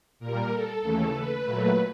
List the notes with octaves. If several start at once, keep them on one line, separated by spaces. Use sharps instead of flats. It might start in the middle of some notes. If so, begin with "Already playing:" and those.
A#2 G3 A#4
A4
D#2 C#3 E3 A3
B4
A#2 F#3 A3